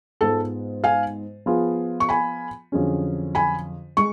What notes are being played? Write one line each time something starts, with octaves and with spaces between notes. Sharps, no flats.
G#2 G#3 B3 F4 G#4 A4
F5 G#5
F3 B3 F4 G#4
C#6
G#5 B5
F2 D3 F#3 C#4 G#4
G#5 B5
G#3 C#6